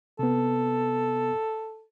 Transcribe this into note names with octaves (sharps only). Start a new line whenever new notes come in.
C3 B3 A4